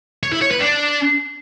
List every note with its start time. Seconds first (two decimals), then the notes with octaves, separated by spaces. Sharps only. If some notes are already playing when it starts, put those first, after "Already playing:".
0.23 C#5
0.32 E4
0.42 C#5
0.51 B4
0.60 D4